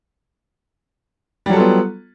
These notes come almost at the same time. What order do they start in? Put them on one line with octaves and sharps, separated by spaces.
G3 F#3 A4 F4 B3